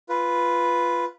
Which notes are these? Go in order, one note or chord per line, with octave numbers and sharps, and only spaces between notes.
F4 B4